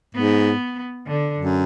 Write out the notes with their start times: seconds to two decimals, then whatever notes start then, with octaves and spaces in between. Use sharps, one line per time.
0.15 G#2 B3
1.07 D3
1.38 F#2